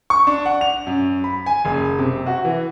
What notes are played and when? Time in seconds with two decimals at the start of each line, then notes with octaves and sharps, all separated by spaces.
0.10 C#6
0.27 D4
0.46 F#5
0.61 F7
0.87 F#2
1.24 B5
1.46 G#5
1.65 F#1
1.99 C3
2.26 F#4
2.45 E3